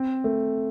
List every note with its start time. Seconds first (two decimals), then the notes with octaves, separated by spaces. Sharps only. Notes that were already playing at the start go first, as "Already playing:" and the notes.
Already playing: C4
0.24 A3